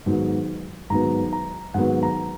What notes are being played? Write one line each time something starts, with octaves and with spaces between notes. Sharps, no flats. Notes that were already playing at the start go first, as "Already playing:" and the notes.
G#2 D#3 F#3 B3
G#2 D#3 F#3 B3 A#5
A#5
G#2 D#3 F#3 B3 F#5
A#5